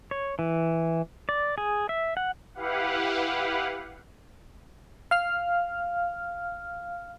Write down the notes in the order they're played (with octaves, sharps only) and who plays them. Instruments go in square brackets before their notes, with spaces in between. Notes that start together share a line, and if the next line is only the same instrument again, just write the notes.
[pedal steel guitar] C#5
E3
D5
G#4
E5
F#5
[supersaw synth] E4 G4 B4 F5 F#5
[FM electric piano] F5 F6